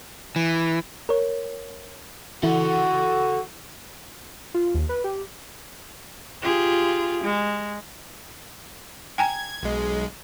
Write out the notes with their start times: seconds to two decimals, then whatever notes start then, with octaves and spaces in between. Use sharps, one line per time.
0.36 E3
1.09 A#4 C#5
2.43 E3 E4 F#4 A4 F#5
4.54 F4
4.74 D#2
4.89 B4
5.04 G4
6.42 F4 G4 G#4
7.23 G#3
9.18 G5 G#5 A#5 G#6
9.63 B1 G#3